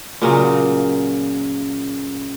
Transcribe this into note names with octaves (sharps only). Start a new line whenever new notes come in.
A#2 C#3 F#3